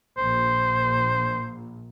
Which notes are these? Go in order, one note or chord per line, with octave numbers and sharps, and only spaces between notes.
A#1 A#2 C5